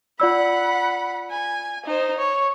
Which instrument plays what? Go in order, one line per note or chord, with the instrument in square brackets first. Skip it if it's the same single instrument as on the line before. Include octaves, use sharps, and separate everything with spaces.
[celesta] F4 D5 E6 [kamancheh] F#5 B5
[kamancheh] G#5
D#4 C5
C#5